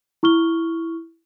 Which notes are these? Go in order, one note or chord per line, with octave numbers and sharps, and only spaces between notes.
E4 C#6 F6 G7